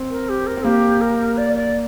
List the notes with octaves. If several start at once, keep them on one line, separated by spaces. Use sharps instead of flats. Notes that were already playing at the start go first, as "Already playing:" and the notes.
Already playing: C4
A#4
G4
A#4
C4
A#3 G4
A#4
D5
D5